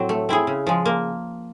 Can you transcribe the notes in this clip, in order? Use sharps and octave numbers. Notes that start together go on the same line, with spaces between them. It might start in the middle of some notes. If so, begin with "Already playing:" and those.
Already playing: A2 F#3 C4
A3
C4 E4 G#4
C#3
F3 G#3
A#3